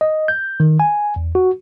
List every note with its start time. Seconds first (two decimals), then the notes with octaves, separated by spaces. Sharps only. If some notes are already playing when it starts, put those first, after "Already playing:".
0.01 D#5
0.28 G6
0.60 D#3
0.80 G#5
1.16 E2
1.35 F#4